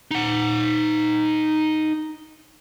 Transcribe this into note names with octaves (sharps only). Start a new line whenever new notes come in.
D#4 F#5